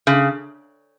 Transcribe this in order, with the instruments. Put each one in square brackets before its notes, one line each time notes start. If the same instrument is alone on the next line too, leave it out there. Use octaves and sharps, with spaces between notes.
[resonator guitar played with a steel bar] C#3